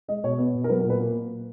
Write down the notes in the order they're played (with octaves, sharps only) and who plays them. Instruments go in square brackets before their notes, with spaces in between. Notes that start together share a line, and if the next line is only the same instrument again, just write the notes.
[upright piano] G#3 D#5
B2 C#5
B3
B2
A#4
F#3 B4
A#4
A#2
B4
A#3